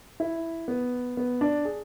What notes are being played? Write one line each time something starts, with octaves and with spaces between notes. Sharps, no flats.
E4
B3
B3
D4
G#4